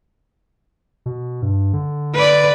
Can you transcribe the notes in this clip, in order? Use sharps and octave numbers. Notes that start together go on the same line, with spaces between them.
B2
G2
D3
B4 D5